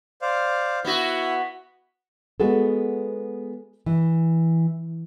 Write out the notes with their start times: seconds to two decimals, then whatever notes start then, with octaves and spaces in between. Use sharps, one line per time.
0.22 C5 D5 F5
0.85 B3 E4 F#4
2.40 G#3 B3 F#4 G#4 A4
3.86 E3